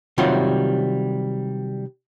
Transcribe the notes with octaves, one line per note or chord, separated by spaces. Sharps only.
C3 D#3 F#3 G3 F4 F#4